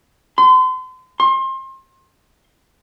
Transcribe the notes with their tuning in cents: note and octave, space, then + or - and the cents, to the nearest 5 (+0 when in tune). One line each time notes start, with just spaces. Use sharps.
C6 -40
C6 +30